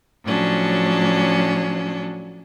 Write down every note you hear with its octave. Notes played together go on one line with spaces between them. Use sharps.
A2 F3 F#3 C#4 D4